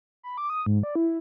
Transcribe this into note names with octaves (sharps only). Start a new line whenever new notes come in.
B5
D6
D#6
G#2
D5
E4